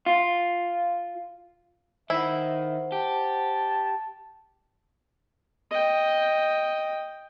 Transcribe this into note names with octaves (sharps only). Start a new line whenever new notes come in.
F4
D#3 E4 C5 E5 F#5
G4 A5
D#5 G5